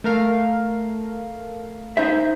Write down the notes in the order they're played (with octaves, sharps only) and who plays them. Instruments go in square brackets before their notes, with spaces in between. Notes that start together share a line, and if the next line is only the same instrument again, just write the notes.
[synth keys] A3 A#4 F5
[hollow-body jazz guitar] D#4 C5 E5